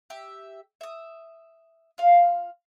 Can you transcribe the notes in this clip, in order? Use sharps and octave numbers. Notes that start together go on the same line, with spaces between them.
G4 E5
E5 D#6
F4 F5